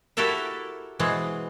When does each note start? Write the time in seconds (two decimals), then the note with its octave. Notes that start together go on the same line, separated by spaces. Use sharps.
0.17 E4 F#4 G4 A4 A#4 E5
0.99 B2 E3 G#3 C4